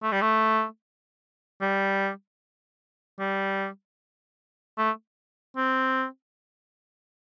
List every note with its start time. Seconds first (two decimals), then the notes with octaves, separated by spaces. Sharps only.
0.03 A3
0.12 G3
0.22 A3
1.61 G3
3.19 G3
4.78 A3
5.57 C4